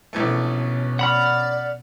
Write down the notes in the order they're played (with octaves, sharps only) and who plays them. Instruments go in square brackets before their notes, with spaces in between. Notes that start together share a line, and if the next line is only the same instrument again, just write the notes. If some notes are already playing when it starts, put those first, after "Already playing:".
[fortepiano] A#1 E3 A3 [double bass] B2 C#4
[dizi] D5 [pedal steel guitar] F#5 B5 F6